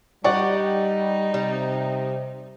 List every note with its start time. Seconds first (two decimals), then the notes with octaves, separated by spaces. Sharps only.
0.24 G3 D#4 G4 D5 F#5 C#6
1.34 C3 G3